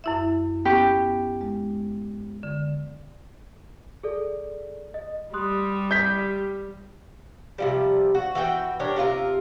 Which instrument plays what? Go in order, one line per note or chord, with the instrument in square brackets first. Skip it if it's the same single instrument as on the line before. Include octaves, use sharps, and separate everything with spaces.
[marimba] F#2 E4 E5
[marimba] B3 C#4 [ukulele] G4
[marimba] G#3
D3
[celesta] G#4 A4 D5
D#5
[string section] G3 [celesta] C6 D#6 F#6
[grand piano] G6 B6
[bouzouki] C3 F3 G3
F#4
E3 F#4 G#4 G5
D4 G4 A#4 C#5
C3 D4 F4 A#4